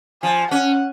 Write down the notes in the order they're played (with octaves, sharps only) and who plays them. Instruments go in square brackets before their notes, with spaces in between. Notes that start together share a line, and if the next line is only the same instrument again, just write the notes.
[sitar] F3 [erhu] G#5
[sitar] C#4 [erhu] F#5